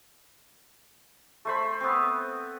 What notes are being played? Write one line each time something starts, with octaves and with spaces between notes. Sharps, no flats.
A3 C5 B5
B3 C4